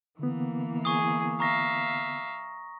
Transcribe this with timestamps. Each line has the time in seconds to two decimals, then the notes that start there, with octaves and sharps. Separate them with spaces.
0.19 D3 E3 A#3 B3
0.85 G#4 C#6 D#6
1.40 E5 F5 A#5 C#6 A#6